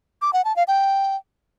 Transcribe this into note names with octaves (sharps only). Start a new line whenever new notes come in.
D6
F#5
A5
F5
G5